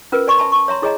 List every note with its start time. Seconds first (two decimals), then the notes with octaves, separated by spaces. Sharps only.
0.12 C#4 F4 A#4 B4
0.27 C5 D5 G#5 C6 C#6
0.39 E5 G#5 A5 B5
0.52 A5 C#6
0.68 C#5 E5 A#5 C6
0.82 E4 G#4 C#5 D#5 G#5 A#5